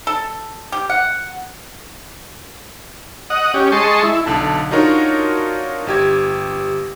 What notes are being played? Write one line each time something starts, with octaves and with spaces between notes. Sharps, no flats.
A4
G4
F#5
D#5 F#5
C#4 G4
G#3 D#5 A5 C6 C#6
E4
B1 D3 A5
D4 D#4 F4 F#4 A#4 C#5
G1 G4 G#6